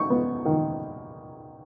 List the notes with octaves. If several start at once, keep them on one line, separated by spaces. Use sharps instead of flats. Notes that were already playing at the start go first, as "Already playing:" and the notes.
Already playing: D#4 C#6
B3
D#3